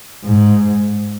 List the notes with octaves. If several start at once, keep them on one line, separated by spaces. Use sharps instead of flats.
G#2